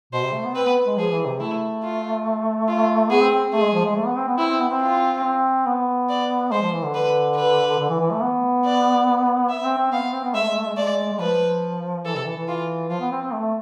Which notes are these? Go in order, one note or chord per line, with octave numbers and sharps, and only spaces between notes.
B2 C5
C3
A3
B3
C4 B4
B3
G#3
F3 G#4
E3
C3
A3 E4
F4
F4
B3 G#4
C4
C4
A3 G#4
G#3
F3
G#3
A3
B3
C4
B3
C4 E4
C4
B3
C4
F4
C4
B3
D5
G#3 C5
F3
E3
D3
B4
B4
D3
E3
E3
A3
B3
D5
E5
C4
C4
B3 F5
B3
C4
B3
G#3 E5
A3
G#3
A3
G#3
A3 D5
G#3
G#3
F3 B4
E3 A4
C3
E3
E3
F4
F3 F4
B3
C4
C4
A3